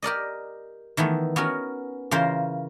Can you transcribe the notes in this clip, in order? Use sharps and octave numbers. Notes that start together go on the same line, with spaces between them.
G4 A#4 D5 D#5
D#3 E3 A3 B3
B3 C#4 F#4 A#4
C#3 E3 F4 A#4 C5